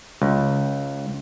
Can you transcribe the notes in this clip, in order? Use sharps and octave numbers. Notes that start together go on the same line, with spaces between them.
C#2